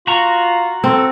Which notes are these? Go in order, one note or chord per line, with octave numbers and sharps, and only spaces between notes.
F4 F#4 A#5 C#6
C4 A4